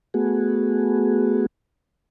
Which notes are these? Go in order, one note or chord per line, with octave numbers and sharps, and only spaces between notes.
A3 B3 F#4 G#4